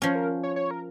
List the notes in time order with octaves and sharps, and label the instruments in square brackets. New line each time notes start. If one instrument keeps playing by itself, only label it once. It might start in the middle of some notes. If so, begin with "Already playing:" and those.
[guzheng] F3 C#4 [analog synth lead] C#5
[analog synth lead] A#4
C#5
C#5
A#4